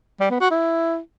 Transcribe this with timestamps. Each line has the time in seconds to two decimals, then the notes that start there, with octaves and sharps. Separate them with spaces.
0.20 G3
0.30 B3
0.40 F#4
0.51 E4